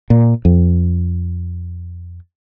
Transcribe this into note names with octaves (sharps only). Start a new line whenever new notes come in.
A#2
F2